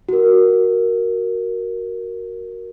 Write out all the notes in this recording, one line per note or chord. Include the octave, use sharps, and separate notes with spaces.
F#4 A#4